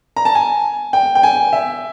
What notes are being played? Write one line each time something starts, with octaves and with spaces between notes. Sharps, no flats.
A#5
A5
G#5
G5
G5
G#5
E5